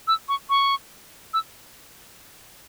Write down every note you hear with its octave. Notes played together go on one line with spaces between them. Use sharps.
E6
C#6
C#6
E6